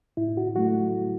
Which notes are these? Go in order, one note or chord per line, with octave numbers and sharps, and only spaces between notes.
A2 E4
F#4
F#3 A3 F#4